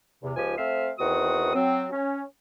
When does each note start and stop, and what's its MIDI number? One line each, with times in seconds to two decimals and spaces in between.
0.23 0.36 40
0.23 0.36 48
0.36 0.54 37
0.36 0.54 53
0.36 0.54 63
0.36 0.54 67
0.36 0.54 80
0.57 0.90 57
0.57 0.90 60
0.57 0.90 72
0.57 0.90 76
0.57 0.90 77
0.98 1.53 40
0.98 1.53 51
0.98 1.53 60
0.98 1.53 66
0.98 1.53 78
0.98 1.53 87
1.55 1.88 54
1.55 1.88 60
1.92 2.23 61